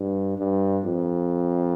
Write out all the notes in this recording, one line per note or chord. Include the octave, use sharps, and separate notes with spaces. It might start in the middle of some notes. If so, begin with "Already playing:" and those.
Already playing: G2
G2
F2